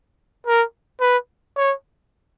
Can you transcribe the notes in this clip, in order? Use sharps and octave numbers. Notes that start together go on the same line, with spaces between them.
A#4
B4
C#5